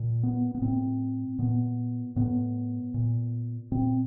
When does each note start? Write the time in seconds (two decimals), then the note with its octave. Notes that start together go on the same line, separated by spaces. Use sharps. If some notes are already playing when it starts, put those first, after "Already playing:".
Already playing: A#2
0.23 B3
0.55 B3
0.62 A2 C4
1.39 A#2 B3
2.16 A2 B3
2.94 A#2
3.72 A#2 C4